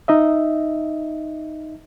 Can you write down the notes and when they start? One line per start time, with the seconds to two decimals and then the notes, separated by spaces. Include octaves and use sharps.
0.08 D#4 D#5 E5